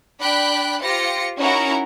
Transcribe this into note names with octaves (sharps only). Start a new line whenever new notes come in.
D4 D5 G5 B5 F#6 B6
F4 G4 C5 A#6 C#7
C#4 D#4 E4 F#4 A#4 A#5